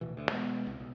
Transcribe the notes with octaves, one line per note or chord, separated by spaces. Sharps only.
D1 B2 E3
D2
B2 G#3 B3
C2
B1